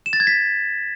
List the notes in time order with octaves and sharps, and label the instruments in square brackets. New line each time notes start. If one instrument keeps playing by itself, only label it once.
[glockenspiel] E7
A6
G#6
B6